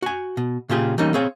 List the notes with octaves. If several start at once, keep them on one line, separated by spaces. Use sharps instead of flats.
F#4 G#5
B2
A#2 C#3 F4 G4 G#4
E3 G3 A#3 C#4 D#4
C4 G#4 C#5 F5